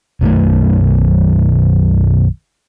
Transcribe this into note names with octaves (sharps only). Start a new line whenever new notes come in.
B1 F#2 D#3 A3